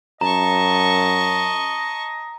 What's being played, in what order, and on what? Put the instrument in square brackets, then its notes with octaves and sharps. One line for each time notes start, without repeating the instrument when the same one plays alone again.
[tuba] F#2 [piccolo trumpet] D#5 [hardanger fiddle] A5 C#6 [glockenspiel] A#5